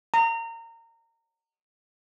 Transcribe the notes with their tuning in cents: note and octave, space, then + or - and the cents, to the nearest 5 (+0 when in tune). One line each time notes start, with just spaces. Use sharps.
A#5 -25